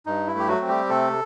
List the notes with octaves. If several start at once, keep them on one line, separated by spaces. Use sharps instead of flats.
G2 D#4
E4
A3 G4
F#3 F#4
C4
G3 G4
C3 A3 A4